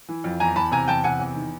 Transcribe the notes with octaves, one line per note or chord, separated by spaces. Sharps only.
E3
F2
E2 G#5 A#5
E2 A5 B5
C3 G#5 A#5
E2 G5 A5
C3 F#5 G#5
E2
D#3